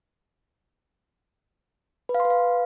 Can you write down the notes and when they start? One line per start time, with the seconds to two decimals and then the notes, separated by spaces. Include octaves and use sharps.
2.09 B4
2.15 F5
2.20 C6
2.25 B4
2.30 F5